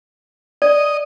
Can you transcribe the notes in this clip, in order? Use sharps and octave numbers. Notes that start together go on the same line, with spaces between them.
D5 D#5